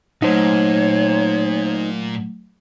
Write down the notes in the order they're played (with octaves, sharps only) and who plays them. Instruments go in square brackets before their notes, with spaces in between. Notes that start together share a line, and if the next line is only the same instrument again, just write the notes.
[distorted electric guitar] A#2 [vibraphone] F#3 A3 [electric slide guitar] D#4 C5 [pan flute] C#5